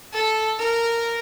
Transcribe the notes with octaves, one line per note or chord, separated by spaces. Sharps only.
A4
A#4